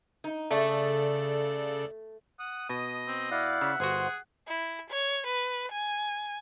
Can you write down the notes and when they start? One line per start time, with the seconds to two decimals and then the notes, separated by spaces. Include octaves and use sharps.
0.24 D#4
0.51 C#3 A3 A4 D5
2.39 F#5 D#6
2.69 B2 D#5
3.07 C4
3.31 E4 D5 F5 F#5
3.61 C#3 E5
3.80 G1 F#4 G#4 C5
4.47 E4
4.90 C#5
5.27 B4
5.72 G#5